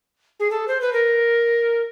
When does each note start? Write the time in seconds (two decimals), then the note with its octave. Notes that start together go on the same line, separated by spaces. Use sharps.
0.39 G#4
0.50 A4
0.67 C5
0.80 B4
0.92 A#4